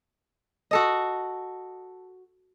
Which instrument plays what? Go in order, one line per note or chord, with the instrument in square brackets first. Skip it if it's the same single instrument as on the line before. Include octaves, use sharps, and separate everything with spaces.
[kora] F#4 A4 D#5